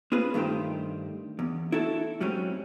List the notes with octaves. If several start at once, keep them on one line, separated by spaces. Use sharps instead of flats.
C4 F4 G#4 B4
G2 D#3 A3 G4 C5
E2
E4 F#4 A4 E5
G#2 F#3 G3 C4 C#4